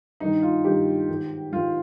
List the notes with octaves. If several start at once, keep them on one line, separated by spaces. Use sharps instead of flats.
G2 D#3 D#4
F4
G2 D#3 G4
G#2 D#3
G#2 D#3 F4